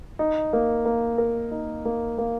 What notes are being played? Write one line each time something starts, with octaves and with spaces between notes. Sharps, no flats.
D#4
A#3
A#3
A#4
D#4
A#3
A#3